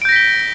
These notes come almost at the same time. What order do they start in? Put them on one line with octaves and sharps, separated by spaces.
D7 G6 A#6 B6 G7